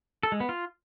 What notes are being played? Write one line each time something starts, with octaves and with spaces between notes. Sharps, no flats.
A4
G#3
B3
F4